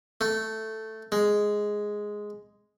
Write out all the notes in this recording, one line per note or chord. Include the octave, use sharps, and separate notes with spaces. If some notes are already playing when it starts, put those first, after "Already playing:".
A3
G#3